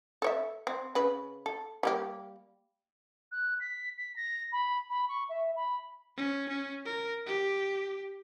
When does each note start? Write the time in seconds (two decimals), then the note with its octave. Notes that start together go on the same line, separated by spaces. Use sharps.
0.22 A4 C#5 E5
0.67 C4
0.95 C#3 B4
1.46 A4
1.83 G3 A#3 G4
3.32 F#6
3.60 B6
3.97 B6
4.16 A#6
4.52 B5
4.90 B5
5.09 C#6
5.29 E5
5.56 B5
6.17 C#4
6.49 C#4
6.85 A#4
7.26 G4